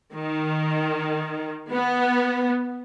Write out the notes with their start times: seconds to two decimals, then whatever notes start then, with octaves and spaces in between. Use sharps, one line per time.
0.13 D#3
1.72 B3